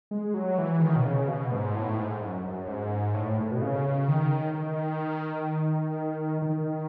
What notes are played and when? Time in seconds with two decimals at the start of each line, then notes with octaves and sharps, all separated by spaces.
0.11 G#3
0.34 F#3
0.58 E3
0.81 D#3
0.96 B2
1.05 C#3
1.28 B2
1.52 G#2
1.75 A2
1.98 G#2
2.21 F#2
2.45 F#2
2.68 G#2
3.14 A2
3.40 A2
3.52 B2
3.62 C#3
4.08 D#3
4.55 D#3
6.42 D#3